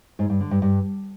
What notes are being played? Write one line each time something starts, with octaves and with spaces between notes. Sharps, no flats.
G#2
G2
D3
G2
G2